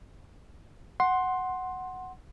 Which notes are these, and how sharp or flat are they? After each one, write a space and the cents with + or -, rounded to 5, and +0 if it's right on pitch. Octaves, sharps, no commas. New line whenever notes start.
F#5 +0 C6 +10